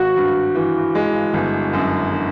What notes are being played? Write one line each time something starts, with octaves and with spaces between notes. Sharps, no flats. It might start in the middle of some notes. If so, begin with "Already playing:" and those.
Already playing: G#1 F#4
G2
E3
G#3
G1
F#2
D3